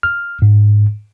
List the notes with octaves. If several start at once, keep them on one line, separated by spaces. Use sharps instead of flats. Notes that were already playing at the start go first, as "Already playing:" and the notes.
F6
G#2